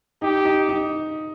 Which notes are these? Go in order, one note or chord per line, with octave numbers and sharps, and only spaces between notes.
D#4 G4
D#4
D#4